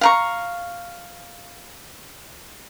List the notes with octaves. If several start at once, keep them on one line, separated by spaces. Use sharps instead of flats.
F5 A#5 C#6